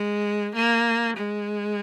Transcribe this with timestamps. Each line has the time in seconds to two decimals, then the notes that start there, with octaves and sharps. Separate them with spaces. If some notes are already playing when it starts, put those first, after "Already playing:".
Already playing: G#3
0.55 A#3
1.17 G#3